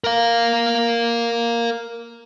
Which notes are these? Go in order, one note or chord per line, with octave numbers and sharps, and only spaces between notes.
A#4 F5